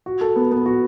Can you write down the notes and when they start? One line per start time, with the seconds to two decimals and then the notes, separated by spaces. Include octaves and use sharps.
0.06 F#4
0.21 A4
0.36 B3
0.51 B3
0.66 F#4